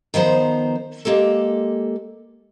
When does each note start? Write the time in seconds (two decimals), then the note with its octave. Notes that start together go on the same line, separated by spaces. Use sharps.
0.14 D#3 F3 B3 C5 A#5
1.05 G#3 A#3 G4 A4